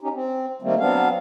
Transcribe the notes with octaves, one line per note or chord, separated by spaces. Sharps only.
C#4 D#4 G4
C4
D#3 G3 A3 A#3 C4
F#3 B3 C4 D4 F5